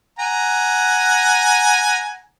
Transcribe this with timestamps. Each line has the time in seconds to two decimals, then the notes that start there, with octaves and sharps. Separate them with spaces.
0.19 F#5 G#5 A#5